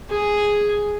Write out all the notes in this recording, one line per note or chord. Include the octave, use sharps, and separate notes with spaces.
G#4